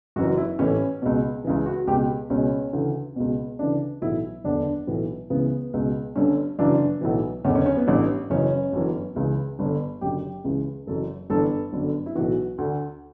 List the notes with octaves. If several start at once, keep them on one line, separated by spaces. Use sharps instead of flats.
F#1 F#2 E3 F#4
E4
A1 A2 E3 C#4
C#2 B2
C#2 C#3 E3
F#4
C#2 B2 G4
C#2 B2 C#4
D2 C#3 E3
C#2 B2
D2 C#3 E3 D4
B1 A2 E3 E4
F#1 E2 D3 D4
B1 A2 E3
C#2 C#3 E3 B3
C#2 B2
G1 G2 D3 C#4
G1 F#2 C#3 E3 D4
B1 A2 E3
F#1 E2 D3 C#4
C#4
C#4
B3
A1 G2 E3
F#1 F#2 C#3 E3 C#4
G1 F#2 E3
C#2 C#3 E3
G1 G2 D3
F#1 F#2 D3 G4
C#2 C#3 E3
F#1 F#2 E3 A4
G1 G2 E3 A4
G1 F#2 D3
E4
B1 A2 E3 F#4
D2 D3